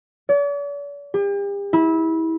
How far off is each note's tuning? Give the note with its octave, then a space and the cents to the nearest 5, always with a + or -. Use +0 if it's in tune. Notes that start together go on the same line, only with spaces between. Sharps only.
D5 -45
G4 +40
E4 -25